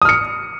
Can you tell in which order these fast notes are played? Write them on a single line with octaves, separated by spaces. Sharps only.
D#6 F6 C#7